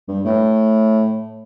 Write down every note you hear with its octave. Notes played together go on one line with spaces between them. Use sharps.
G2
A2